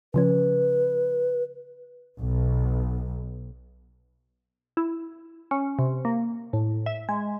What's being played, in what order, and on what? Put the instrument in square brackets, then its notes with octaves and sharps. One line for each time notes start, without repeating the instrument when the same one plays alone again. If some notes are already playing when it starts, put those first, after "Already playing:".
[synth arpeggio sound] C#3 F3 C#4 [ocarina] B4
[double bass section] B1
[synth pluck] E4
C#4
C3
A#3
A2
E5
G#3